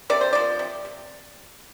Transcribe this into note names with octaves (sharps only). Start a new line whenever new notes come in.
C3 D5
C5
F3 D5
C3
C3